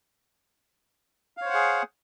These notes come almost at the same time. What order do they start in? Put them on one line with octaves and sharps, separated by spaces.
F5 C#5 C5 F#5 G#4